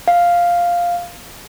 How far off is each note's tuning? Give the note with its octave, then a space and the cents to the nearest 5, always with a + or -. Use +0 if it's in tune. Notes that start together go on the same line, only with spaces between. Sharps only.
F5 +0